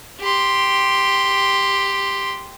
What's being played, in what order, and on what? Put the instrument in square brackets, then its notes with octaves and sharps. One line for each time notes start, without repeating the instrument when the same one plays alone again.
[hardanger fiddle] G4 C6